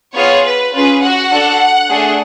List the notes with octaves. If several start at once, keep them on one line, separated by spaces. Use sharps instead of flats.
B3 F4 G#4 C#5
B4
C#4 F4 G#4 B4
F#4 F#5
D4 F#4 A4
A3 D4 G#4